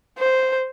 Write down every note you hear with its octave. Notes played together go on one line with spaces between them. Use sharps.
C5